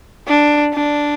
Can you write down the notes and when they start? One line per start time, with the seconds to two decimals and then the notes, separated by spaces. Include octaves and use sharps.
0.28 D4
0.74 D4